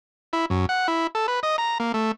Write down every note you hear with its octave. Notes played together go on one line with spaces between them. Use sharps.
E4
F#2
F#5
E4
A4
B4
D#5
A#5
A#3
A3